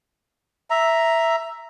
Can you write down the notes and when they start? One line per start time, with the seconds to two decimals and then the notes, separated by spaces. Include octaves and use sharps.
0.70 E5 A#5